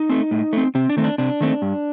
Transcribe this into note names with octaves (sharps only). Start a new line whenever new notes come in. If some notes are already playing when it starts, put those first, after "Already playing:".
Already playing: D#4
A3 C4
A2
A3 C4
C3 C4
D4
D#3 A3 C4
D4
C3 D4
D#3 A3 C4
G2